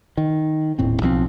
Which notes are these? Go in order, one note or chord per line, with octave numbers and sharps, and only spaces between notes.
D#3
D#1 A2 C4
B1 F3 G#3 C4